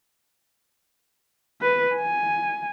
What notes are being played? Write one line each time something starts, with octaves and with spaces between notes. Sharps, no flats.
B4
G#5